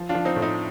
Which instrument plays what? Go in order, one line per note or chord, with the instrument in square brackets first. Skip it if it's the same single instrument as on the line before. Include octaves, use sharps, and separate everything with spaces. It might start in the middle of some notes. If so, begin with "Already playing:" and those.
Already playing: [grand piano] F3
D4 F4
F3
C4 D#4
A2
C4 D#4